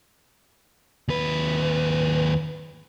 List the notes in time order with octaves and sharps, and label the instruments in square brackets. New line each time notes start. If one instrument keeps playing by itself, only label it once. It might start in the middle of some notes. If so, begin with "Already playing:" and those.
[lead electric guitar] D#2 B4